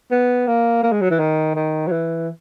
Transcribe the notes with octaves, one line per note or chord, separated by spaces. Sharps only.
B3
A#3
A#3
G#3
F#3
E3
D#3
D#3
F#3
E3